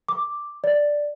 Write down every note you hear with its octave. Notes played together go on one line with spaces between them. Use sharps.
D6
D5